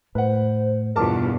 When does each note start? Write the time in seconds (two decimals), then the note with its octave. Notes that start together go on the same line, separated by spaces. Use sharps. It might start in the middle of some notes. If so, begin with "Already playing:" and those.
0.15 A2 B4 C5 F#5
0.96 E2 G2 B2 F4 A#4 A5 D6